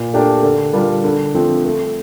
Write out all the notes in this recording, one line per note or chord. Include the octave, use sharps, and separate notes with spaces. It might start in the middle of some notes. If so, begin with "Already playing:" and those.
Already playing: A#2
A3 D4 G4 A#4
D3
G3 D4 F4 A#4
D3
F3 A3 C4
A3